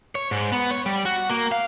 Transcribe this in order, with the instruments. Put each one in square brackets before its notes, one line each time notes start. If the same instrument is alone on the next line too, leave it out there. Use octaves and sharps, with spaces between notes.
[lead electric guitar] C#5
G#2
B3
C#5
G3
F#4
A#3
F5